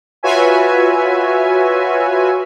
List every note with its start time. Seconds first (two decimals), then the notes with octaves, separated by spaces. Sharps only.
0.23 F4 F#4 B4 C#5 E5 G#5